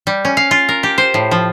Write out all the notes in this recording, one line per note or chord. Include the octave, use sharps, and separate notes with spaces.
G3
C#4
F5
F4
A#4
G4
C5
A2
F3